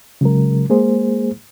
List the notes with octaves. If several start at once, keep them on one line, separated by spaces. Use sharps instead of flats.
C#3 F#3 G#3 A#4
G#3 A#3 G#4 C5